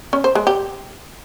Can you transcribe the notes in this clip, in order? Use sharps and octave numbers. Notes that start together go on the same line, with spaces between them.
C#4
C5
G#3
G4